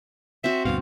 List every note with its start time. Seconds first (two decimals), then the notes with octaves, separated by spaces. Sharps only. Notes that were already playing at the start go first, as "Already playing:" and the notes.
0.44 C4 F#4 E5
0.65 D2 G2 B2 F5